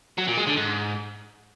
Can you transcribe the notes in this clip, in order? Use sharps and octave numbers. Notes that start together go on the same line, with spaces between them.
F#3
A#2
G#3
D3
G#2